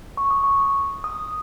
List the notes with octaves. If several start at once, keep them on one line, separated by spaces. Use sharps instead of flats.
C#6
D#6
C#6
D#6